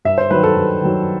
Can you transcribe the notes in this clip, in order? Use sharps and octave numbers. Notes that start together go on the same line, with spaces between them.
G2 E5
C5
D#3 F#3 B4
A4
G2
D#3 F#3